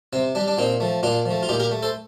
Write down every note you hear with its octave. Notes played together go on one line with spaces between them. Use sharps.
C3 C4
G3 D4
D4
A#2 C4 D#4
F3 A3
A#2 D4 F4
F3 A3
F4
A#2 D#4 G4
G4 A#4
A3
A4 C5